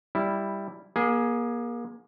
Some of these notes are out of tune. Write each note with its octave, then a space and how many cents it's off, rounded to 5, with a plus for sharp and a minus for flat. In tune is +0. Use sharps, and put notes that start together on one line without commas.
G3 +5 E4 +0
A#3 +30 G#4 +0